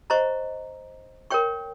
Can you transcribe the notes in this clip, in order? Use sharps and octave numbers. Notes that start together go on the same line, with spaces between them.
C5 D#5 A#5 C#6
A#4 C#5 G5 C#6